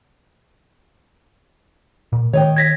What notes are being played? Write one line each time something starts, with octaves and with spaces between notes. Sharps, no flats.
A#2
D#3 C#5 D#5 G5
G#6 A#6 B6